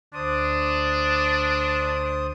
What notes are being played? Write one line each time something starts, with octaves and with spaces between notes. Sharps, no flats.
D2 D4 C5 D#6